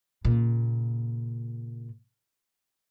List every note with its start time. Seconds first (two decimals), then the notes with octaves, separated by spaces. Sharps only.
0.25 A#2 C#3